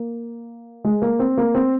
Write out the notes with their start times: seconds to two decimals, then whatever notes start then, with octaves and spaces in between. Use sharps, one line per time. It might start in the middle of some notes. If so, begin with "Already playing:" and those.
Already playing: A#3
0.84 G#3
1.02 A#3
1.19 C4
1.37 A#3
1.55 C4